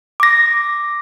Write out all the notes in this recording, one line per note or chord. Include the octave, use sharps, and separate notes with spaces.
D6 A#6